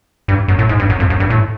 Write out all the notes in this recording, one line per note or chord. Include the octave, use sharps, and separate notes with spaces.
G2
F#2
A2
G#2
G2
F#2
F2
F#2
G2
A2